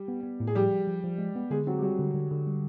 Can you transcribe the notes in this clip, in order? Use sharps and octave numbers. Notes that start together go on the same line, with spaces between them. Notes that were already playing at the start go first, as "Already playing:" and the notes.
Already playing: G3 G4
B3
B3
A2
G#4
F3 G3 G4
F3
F3
F3
G#3
B3
D3 G#3 G#4
F#3 C4 F#4
G4
F#3 G3 F#4
D3
D3
D3
G3